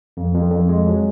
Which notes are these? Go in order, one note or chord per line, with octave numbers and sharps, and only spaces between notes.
F2
F2
F2
G#3
F#3